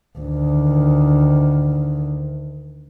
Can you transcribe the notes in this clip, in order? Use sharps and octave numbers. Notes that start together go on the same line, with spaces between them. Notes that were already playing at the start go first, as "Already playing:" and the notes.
D2 D#3